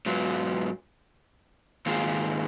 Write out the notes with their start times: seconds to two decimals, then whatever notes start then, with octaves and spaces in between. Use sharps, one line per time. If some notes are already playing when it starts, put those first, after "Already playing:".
0.06 G#2 F#3 B3 F4
1.86 G#2 D#3 A#3 F4 G#4